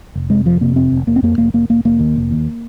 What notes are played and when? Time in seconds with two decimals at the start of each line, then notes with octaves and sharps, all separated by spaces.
0.15 F1
0.30 C3 G#3
0.45 F2 F3
0.61 C3 A#3
0.76 F1 C4
0.92 F1
1.07 F1 A#3
1.16 C4
1.22 F2 A#3
1.38 F1 A#3
1.54 F1 A#3
1.69 F1 A#3
1.85 F1 A#3
1.99 D#2
2.16 F1
2.31 D#2